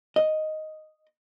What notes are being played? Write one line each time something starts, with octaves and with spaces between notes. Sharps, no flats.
D#5